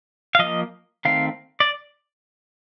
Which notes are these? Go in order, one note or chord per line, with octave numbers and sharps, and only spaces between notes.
F5
F3 A#3 D#5
D#3 A3 C4 F5
D5